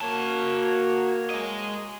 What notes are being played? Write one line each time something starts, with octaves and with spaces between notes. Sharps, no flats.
A#3 F#4 C#5 A5
G#3 D#5